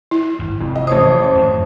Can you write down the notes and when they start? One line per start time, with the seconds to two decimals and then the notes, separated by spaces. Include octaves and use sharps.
0.11 E4
0.39 G#1 G2
0.61 F1 F2
0.76 D#5
0.87 A1 C5 C#5 A5 D#6
1.35 F2 G#2 D#3